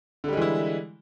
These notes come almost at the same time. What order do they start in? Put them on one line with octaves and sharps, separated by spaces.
D3 G3 G#3 E3 E4